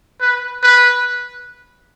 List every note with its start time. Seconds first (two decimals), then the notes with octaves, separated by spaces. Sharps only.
0.21 B4
0.63 B4